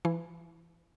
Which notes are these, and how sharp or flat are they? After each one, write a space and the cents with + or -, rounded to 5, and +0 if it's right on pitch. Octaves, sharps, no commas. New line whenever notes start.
E3 +25 E4 +0